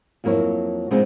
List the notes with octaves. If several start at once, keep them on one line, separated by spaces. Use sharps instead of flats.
F2 F#3 A#3 E4 C#5
A#2 C#3 G#3 B3 C4 D#4